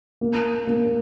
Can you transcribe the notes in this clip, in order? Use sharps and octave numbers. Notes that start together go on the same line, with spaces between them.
A#3
A#3